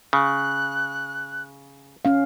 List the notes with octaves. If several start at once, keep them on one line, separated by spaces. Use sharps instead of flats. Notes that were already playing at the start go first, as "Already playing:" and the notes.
C#3 F#6
C#4 F5